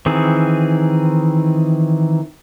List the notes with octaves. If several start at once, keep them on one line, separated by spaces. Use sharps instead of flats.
D#3 E3 C4 G#4